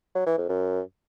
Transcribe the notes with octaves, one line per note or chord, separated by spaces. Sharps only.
F#3
E3
F2
F#2